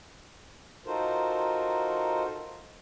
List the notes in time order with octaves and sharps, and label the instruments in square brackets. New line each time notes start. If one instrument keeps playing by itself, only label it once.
[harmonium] D#4 F4 F#4 A4 A#4 C5